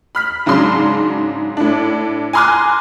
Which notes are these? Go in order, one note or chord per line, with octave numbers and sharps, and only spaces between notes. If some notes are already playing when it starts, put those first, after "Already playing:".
B5 F6 B6
G#2 C#3 F#3 D4 C6
A2 D4
G#5 A#5 C6 D6 F6 F#6